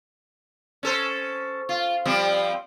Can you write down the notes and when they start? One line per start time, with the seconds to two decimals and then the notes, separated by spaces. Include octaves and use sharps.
0.83 C#4 A4 C5
1.69 F4
2.06 F3 G3 C4